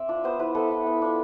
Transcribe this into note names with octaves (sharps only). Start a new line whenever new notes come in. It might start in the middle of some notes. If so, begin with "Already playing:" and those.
Already playing: C4 D5 E5
D4 F4
B3 C5
E4 B4
B3 A4
E4
B3
D4 F4